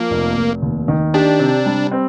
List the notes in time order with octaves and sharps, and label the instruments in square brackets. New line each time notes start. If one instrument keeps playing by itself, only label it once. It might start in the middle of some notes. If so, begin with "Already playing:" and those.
Already playing: [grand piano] F3 [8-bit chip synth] A#3
[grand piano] F1
F1
D#2
D#3
[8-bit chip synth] D4 [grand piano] G4
[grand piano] C3
G3
C4